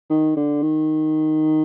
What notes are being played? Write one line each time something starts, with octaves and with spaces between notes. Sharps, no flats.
D#3
D3
D#3